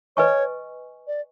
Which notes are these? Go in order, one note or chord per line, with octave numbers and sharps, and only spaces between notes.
B4 C#5 D#5 G#5 C#6
D5